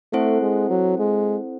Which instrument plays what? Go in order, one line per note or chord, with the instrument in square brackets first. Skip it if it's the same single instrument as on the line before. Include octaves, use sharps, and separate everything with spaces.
[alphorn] A3 [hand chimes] C4 E4 A4 C5 F#5
[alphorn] G#3
F#3
G#3